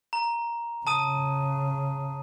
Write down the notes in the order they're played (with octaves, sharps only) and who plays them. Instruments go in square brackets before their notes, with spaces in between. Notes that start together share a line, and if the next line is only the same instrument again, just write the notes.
[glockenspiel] A#5
[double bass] C#3 [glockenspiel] A5 D#6 D#7